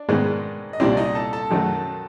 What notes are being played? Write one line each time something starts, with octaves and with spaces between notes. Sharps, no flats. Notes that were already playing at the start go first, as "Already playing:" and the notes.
Already playing: D4 D5
G#2 D#3 G#3 B3
D#5
C2 A#2 G3 C4 D4 E4 D5
D#4 D#5
A4 A5
A4 A5
F#2 D#3 F#3 A3